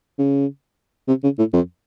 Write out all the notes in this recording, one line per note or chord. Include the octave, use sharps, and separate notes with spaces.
C#3
C3
C#3
A2
F2